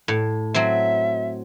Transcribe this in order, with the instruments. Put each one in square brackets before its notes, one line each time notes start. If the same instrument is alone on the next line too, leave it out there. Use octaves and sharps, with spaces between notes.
[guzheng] A2
[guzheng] F#3 C4 [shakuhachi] E5